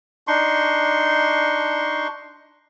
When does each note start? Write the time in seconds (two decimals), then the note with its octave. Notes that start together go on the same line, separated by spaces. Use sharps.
0.27 D4 D#4 C6 C#6